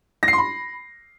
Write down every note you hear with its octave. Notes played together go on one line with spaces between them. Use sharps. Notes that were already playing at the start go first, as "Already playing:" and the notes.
A#6
C7
C6
B5